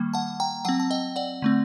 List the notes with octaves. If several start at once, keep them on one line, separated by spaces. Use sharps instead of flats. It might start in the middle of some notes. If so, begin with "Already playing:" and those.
Already playing: D#3 G3 A#3
F#5 A5
G5 A#5
F#3 C4 F#5 A5
A5
D#5 G5
D5 F#5
D3 A3 C4